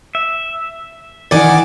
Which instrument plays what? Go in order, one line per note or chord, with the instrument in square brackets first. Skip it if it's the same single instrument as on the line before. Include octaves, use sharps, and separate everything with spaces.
[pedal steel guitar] E5
[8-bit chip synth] D#3 D6 A6 [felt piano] E3 D5 [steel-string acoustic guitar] F#5 G#5